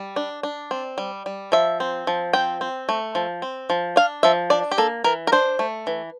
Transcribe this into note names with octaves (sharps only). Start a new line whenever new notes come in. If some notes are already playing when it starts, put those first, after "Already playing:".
Already playing: G3
D4
D4
C4
G3
G3
F3 E5
C4
F3
C4 G5
C4
A3
F3
C4
F3
D4 F5
F3 E5
D4 D5
G4
A#3 A4
E3 A#4
A#4
D4 C5
A3
E3